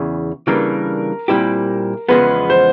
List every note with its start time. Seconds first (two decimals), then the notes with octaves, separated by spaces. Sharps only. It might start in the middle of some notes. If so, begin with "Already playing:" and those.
Already playing: E2 C#3 E3
0.47 C#3 E3 G3 A#3 D4 A#4
1.28 A#2 G3 C4 E4 G4
2.09 E2 C#3 F3 G#3 B3 B4
2.50 C5